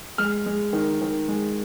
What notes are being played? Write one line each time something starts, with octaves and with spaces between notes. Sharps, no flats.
G#3 F6
G#3
D#3
D#3
G#3